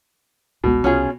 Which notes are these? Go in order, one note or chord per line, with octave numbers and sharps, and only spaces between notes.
G#1 C#2 B2 G#3
C2 C#4 F4 G#4